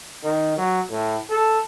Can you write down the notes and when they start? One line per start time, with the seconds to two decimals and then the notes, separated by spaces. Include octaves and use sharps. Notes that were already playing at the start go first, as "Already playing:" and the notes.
0.23 D#3
0.57 F#3
0.90 A2
1.30 A4